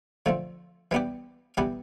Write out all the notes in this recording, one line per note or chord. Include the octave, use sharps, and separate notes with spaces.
D3 F3 A3 C4
E3 G3 B3 D4 G4
E3 G3 B3 D4 G4